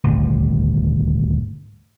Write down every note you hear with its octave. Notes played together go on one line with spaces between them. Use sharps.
D#1 G#1 D2